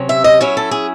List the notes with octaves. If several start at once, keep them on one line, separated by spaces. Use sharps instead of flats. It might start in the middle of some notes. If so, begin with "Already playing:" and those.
Already playing: C3 F#3 C#4
E5
D#5
F#3 C#4 E4 C#5
A4
G#4